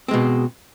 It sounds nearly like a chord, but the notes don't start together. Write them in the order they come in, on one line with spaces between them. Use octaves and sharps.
C4 G#3 B2